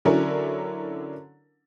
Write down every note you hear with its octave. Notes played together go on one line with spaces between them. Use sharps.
D3 F#3 C#4 D4 E4 A#4